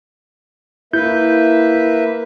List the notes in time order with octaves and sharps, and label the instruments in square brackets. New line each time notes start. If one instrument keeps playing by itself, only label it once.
[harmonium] A#3 B4 E5 [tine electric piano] E4 G6